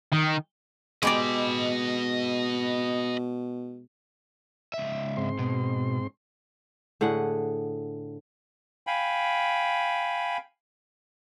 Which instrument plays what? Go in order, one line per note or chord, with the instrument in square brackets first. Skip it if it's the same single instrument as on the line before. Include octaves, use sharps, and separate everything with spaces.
[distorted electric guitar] D#3
[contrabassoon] B2 [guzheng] G#3 G4 D5 [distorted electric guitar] D#5 B5
[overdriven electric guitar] C#2 E5
[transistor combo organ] G#2 C4 C6
[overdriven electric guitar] B2
[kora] A2 D3 G#4 F#5
[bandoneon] F5 G5 G#5 B5